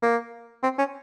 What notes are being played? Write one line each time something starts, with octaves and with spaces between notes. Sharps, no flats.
A#3
C4
C#4